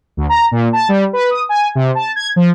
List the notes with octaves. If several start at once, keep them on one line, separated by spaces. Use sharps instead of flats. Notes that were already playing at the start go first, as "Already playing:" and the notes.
D2
A#5
A#2
A5
G3
B4
D#6
G#5
C3
A5
G#6
F3